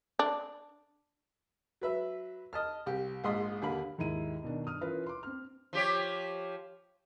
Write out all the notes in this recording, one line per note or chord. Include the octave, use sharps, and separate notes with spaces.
D4
F#3 B4 E5
D#5 A5 F6
C2 G4
A#1 G#2 D#5 C6
D#2 D3 A#3 B5
D#2 G#2 E4 D#7
B2 D#3 D4
G2 D#6 F6
E3 C#4 F4 A#4 B4
C6 D6
C4 F6
F3 G4 C#5